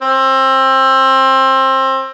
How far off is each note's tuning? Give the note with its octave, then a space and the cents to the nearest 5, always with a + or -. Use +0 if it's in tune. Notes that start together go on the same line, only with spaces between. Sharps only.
C4 +25